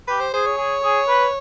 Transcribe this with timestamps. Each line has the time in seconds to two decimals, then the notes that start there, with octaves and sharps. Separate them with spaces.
0.08 G4 B4
0.20 C5
0.34 G#4 C5
0.46 C#5
0.58 G#4
0.83 G#4
1.08 B4